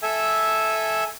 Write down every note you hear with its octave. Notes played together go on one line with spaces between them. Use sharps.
A4 E5 G#5